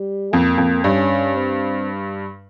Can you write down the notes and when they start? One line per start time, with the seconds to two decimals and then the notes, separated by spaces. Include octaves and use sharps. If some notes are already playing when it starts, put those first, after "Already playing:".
Already playing: G3
0.32 F2 A#3
0.58 F2
0.84 G2 C#4
1.36 C4